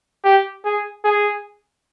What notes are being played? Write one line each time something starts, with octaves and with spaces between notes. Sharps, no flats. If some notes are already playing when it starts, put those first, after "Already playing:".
G4
G#4
G#4